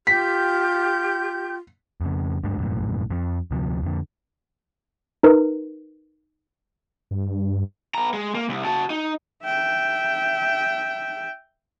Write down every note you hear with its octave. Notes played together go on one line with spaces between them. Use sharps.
F4 G4 G6 B6
F2 C#3
D2 G2 G#3 D4
E1 A#1 F#2 A2
F2 F3
D2 C3 E3 F3
F2 D3
D#4 A#4 B4
G2
B3 A#5
G#3
A#3
C2
F#4 A5
D#4
E5 G5